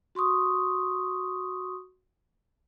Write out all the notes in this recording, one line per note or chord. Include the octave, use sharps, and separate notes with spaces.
F#4 C6 C#6 D#6